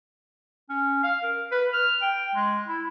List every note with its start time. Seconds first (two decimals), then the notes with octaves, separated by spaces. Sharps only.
0.69 C#4
1.04 F5
1.23 A#4
1.51 B4
1.73 F6
2.02 G5
2.35 G#3
2.67 E4